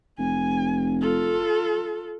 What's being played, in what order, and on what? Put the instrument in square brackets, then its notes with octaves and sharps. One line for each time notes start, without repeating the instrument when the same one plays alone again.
[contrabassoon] F1 [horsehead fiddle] G#5
[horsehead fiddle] F4 A4